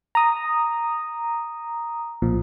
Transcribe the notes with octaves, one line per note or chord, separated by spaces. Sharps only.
A#5 D#6
B1 A#2 F3